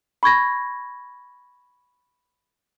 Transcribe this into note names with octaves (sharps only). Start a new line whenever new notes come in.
B5 C#6 G#6 A#6